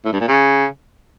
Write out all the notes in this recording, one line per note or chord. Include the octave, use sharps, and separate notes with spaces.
A2
G2
A#2
C#3